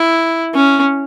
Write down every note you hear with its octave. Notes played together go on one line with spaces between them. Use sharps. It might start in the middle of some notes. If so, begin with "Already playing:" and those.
Already playing: E4
C#4